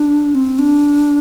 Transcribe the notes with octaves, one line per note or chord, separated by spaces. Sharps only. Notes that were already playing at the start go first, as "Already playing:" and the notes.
Already playing: D4
C4
D4